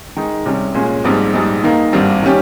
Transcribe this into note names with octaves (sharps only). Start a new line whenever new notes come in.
D#3 G#3 D#4
C2 C3 G3 C#4
A#2 G#3 C#4
A#1 G#2 G3 C4 G4
A#1 G#2 G3
D#3 A#3 D#4
G#1 G2 G3 C4
D#3 G3 C#4 G4